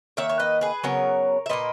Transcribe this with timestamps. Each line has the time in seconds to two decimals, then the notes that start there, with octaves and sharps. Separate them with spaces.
0.17 D#3 A#3 C#5 E5
0.29 C#5
0.39 B4 D#5
0.61 G#4 B4
0.84 C#3 F#3 B3 A#4 C#5
1.46 E5
1.49 A#2 A#3 B4 D#5